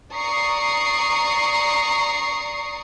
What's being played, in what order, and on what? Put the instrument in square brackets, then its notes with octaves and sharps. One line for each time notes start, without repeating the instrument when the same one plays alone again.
[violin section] D5 A#5 C#6 D#6 C7